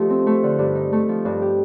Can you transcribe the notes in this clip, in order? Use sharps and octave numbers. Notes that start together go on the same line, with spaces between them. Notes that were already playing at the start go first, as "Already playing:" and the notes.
Already playing: F3 A3 D#4 G4
C4
A3
D3
G2
D#4
A3
F3
G2
G4